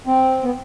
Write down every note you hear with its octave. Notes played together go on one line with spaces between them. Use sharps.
C4
B3